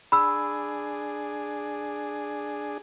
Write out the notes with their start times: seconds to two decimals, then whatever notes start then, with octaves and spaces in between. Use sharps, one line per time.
0.12 D4 G#4 B5 E6